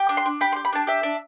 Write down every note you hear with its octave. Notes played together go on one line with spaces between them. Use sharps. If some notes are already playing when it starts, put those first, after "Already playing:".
Already playing: G4
D4
C6
D4
G4 B5
C6
G4
B5
D4 A5
G4 E5
D4